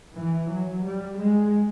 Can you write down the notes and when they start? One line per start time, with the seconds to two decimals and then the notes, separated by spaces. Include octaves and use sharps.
0.15 E3
0.49 F#3
0.83 G3
1.17 G#3